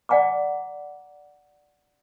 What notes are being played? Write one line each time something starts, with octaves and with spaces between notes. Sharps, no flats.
D5 F#5 G#5 A#5 D6